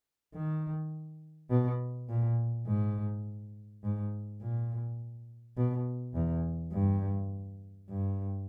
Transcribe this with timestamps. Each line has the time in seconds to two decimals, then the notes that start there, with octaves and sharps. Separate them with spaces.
0.35 D#3
1.50 B2
2.09 A#2
2.67 G#2
3.83 G#2
4.41 A#2
5.57 B2
6.15 E2
6.72 G2
7.89 G2